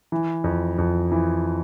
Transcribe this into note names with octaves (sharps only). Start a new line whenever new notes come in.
E3
F2
F2
E3